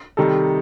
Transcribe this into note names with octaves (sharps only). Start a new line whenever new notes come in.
C3 D#3 G3 D#4 A4